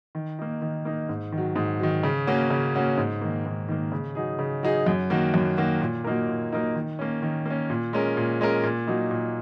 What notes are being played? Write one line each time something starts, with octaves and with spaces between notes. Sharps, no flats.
D#3
A#3 D#4
D#3
A#3 D#4
G#2
D#3
F#3
G#2
D#3 F#3
C#3
A#3 C#4 F#4
C#3
A#3 C#4 F#4
G#2
D#3 A#3
G#2
D#3 A#3
C#3
F#3 D#4 G#4
C#3
F#3 D#4 G#4
F#2
D#3 A#3 F#4
F#2
D#3 A#3 F#4
A#2
F#3 A#3 D#4 A#4
A#2
F#3 A#3 D#4 A#4
D#3
A#3 C#4
D#3
A#3 C#4
A#2
G#3 C#4 A#4
A#2
G#3 C#4 A#4
A#2
F#3 A#3 D#4
A#2